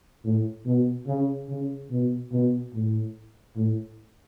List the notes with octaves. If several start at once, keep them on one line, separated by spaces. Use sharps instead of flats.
A2
B2
C#3
C#3
B2
B2
A2
A2